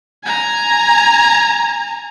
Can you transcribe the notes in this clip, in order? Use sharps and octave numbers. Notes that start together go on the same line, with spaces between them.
G#5 A#5